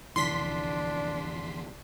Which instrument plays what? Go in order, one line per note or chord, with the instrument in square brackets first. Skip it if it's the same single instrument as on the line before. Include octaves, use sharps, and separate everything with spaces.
[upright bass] C2 A#2 [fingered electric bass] F2 D3 E3 [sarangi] D4 [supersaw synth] C6 B6